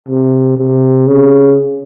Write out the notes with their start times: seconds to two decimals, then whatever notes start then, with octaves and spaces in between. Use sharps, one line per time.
0.09 C3
0.57 C3
1.07 C#3